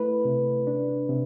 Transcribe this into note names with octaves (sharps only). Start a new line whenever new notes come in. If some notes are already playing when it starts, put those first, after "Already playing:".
Already playing: A3 E4 B4
C3
D4
C3